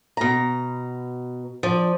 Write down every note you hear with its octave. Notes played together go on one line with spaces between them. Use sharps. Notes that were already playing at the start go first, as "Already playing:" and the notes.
B2 A#5
F3 D5